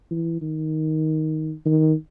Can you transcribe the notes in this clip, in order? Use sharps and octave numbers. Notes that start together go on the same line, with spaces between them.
E3
D#3
D#3